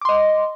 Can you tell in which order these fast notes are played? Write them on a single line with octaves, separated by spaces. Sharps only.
D6 C6 D#5